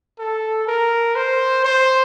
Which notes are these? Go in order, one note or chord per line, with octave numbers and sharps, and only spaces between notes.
A4
A#4
C5
C5